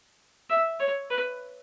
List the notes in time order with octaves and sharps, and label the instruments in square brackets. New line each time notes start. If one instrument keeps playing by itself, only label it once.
[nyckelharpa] E5
C#5
B4